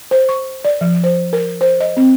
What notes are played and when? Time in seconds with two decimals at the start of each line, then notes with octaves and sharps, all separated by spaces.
0.11 C5
0.29 C#6
0.65 D5
0.81 F3
1.04 C5
1.33 A#4
1.61 C5
1.80 D#5
1.97 C4